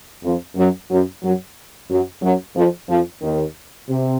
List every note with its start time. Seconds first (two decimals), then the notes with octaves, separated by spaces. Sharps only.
0.23 F2 F3
0.56 F#2 F#3
0.89 F#2 F#3
1.22 F#2 F#3
1.89 F#2 F#3
2.22 F#2 F#3
2.55 F2 F3
2.88 F2 F3
3.21 D#2 D#3
3.88 C3